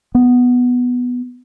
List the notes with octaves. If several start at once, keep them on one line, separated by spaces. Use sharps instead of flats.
B3